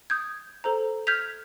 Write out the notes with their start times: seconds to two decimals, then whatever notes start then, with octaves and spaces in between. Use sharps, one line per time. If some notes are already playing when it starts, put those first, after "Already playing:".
0.10 D#6 G6 G#6
0.64 A4 C5 A#5
1.07 F6 G6 G#6 B6 F7